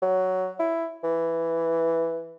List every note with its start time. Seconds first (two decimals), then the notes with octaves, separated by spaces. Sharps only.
0.02 F#3
0.59 E4
1.03 E3